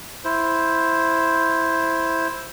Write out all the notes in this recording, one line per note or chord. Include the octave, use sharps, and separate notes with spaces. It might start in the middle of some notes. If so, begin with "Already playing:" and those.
E4 C5